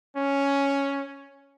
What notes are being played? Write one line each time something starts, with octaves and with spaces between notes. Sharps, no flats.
C#4